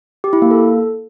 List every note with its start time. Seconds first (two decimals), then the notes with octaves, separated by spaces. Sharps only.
0.24 G4
0.33 E4
0.42 A#3
0.51 A4